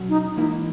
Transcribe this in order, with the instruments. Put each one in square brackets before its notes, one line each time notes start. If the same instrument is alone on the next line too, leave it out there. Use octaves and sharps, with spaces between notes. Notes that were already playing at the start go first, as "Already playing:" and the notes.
Already playing: [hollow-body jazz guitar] B2 F#3 C#4
[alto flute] D#4
[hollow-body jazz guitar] G#2 E3 A#3 E4 A#4 [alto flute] D#4